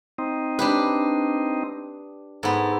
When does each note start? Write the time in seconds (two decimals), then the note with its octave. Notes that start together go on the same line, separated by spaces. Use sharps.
0.18 C4 D#4
0.59 D4 G4 B4
2.43 G#2 B3 A4